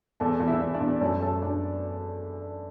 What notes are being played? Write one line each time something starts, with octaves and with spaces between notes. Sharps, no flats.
E2 A4 A5
E2
E4 E5
E2
D4 D5
E2
F#2 A3 A4
F#2 A3 A4
F#2 D4 D5